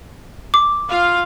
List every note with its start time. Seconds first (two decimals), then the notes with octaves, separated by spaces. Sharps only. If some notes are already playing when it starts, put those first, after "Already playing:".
0.54 D6
0.90 F4 F5